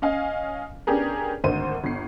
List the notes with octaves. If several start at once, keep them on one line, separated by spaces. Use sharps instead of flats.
C#4 D#5 F5 G#5
B3 C#4 D4 G4 G#4 A#4
G#1 D2 A#3 C5 D#7
G1 C7